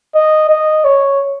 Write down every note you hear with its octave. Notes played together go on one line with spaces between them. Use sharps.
D#5
D#5
C#5